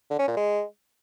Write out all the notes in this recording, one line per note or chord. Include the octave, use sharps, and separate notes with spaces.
D3
C#4
A#2
G#3